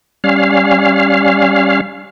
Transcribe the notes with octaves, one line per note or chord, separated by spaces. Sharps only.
G3 C#4 F5